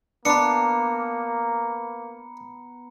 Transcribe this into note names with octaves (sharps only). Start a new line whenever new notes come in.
A#3 B3 D4 A#5 C#7